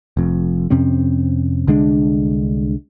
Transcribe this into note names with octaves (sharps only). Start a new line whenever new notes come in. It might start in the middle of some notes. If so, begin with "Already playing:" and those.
F1 F2
F2 C3 C4 C#4
C2 D3 G#3 D4